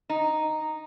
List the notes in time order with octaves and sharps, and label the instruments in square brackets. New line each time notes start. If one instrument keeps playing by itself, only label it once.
[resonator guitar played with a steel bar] D#4